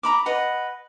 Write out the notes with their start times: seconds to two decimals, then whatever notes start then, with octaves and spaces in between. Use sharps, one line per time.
0.03 A#5 B5 D6
0.26 B4 D#5 F#5